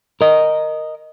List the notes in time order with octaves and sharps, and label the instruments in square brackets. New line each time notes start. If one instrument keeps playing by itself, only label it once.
[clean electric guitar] A#4 D#5